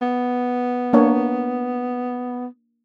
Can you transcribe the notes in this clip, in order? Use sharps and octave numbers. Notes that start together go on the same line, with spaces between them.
B3
A#3 D4 C#5